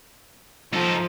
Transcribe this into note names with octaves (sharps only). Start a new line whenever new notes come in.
F3 D#4 A4